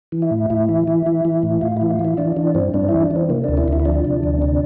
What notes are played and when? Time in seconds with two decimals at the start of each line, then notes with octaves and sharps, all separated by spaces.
0.12 E3
0.22 E4
0.31 A2
0.50 A2 E4
0.69 E3
0.88 E3
1.06 E3
1.25 E3
1.43 A2
1.61 A2 F4
1.77 E3 E4
1.90 F4
1.99 E3
2.05 E4
2.17 E3 D4
2.37 E3 D4
2.55 G2 C4
2.74 G2 D4
2.89 E3 E4
3.02 D4
3.11 E3 C4
3.29 C3 A#3
3.44 D2 D4
3.57 E4
3.68 D2 E4
3.80 E4
3.85 F3 D4
4.05 C3
4.23 D2
4.42 C3